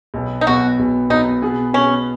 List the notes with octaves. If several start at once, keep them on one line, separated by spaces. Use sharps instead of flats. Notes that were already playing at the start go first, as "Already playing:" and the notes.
B1 B2 B3
D#4
B1 B2 B3 F#4
B1 B2 B3
B1 B2 B3 D#4
B2 B3 G#4
B2 B3 C#4 G#4